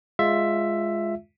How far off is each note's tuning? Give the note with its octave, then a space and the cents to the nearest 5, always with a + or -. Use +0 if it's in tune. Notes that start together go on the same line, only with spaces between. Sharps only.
G#3 +0 F4 +0 E5 +10